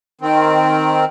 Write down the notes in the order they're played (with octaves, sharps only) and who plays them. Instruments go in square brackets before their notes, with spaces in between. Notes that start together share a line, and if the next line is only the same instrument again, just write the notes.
[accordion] D#3 C4